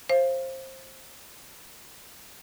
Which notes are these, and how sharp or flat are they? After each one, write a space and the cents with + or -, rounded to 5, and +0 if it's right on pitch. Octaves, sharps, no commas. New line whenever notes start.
C5 +20 F5 -25